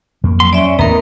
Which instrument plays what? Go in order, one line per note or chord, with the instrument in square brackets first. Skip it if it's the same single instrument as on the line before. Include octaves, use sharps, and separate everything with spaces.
[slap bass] F2 A#3
[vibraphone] F#3 [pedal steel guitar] C6
[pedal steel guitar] C#4 [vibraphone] D5 E5
[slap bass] D#2 A2 [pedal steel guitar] B3 D#4 [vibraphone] A#4 A#5